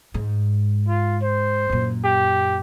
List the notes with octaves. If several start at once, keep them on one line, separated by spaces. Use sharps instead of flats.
G#2
F4
C5
F#2 A#2
G4